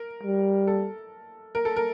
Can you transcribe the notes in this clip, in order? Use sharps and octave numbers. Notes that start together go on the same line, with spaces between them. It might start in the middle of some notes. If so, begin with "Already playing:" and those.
Already playing: A#4
G3
A4
A#4
A4
A#4